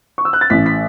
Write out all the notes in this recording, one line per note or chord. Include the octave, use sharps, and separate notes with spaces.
C#6
E6
F#6
A6
A1 B6
B6